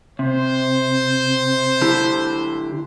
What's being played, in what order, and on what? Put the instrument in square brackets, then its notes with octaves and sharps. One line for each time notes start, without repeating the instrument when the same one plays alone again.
[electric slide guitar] C3 [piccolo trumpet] C5
[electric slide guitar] D3 E4 G4